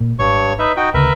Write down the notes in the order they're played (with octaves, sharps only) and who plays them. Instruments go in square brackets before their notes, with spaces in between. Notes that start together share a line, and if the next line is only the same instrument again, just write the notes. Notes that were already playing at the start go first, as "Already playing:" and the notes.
[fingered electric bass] A#2
[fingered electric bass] G#1 [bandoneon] G2 C#5 C#6
[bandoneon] D#4 B4 E5
D#4 F#4 G5
[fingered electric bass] D2 C#3 [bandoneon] A#4 B4 E5